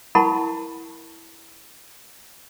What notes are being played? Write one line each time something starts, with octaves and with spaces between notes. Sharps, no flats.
E4 A#4 F#5 A5 B5 C#6